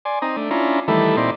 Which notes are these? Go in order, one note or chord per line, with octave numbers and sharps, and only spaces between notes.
D5 G#5 C6
C4 D#4 A#5 D#6
A3 D4
C#4 D4 E4 F4 A#5
D#3 E3 G3 A3 E4 A4
A#2 C4 D#4 E4 D5 C6